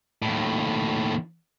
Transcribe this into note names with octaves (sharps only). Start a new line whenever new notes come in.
D#2 A2